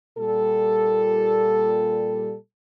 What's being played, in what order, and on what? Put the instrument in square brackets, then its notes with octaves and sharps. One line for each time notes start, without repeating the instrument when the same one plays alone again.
[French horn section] A#2 G3 A4